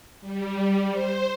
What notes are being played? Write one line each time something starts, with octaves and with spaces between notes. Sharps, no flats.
G3
C5